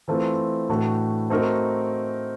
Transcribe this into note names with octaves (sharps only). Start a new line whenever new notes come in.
E3 A3 C4 F4 A4
A2 E3 A3 D4 F#4
A3 C4 D#4 F#4 A#4